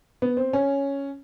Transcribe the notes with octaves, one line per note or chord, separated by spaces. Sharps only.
B3
C4
C#4